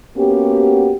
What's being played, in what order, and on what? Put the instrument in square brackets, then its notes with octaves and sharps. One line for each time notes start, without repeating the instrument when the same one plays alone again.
[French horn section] A#3 B3 C#4 F#4 G4